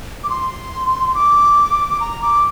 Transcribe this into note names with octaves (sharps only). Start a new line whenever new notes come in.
D6
C6
D6
A#5
D6